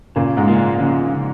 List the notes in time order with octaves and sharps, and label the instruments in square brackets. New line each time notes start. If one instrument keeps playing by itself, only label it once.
[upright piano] A#2 A#3 [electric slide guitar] C#3
[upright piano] G#2 G#3
[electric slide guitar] A#3 F4
[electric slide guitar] C#3 [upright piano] F3